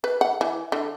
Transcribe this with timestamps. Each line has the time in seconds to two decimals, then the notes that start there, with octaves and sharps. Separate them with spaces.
0.04 B4
0.21 F#5
0.41 E3
0.72 D3